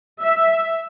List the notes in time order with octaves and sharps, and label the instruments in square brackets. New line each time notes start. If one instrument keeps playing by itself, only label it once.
[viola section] E5